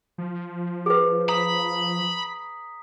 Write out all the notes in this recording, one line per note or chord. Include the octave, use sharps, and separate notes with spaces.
F3
G#4 B4
A#5 B5 D#6 B6